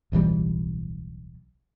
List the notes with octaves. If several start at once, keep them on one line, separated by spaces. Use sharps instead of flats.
D1 B1 E3 G3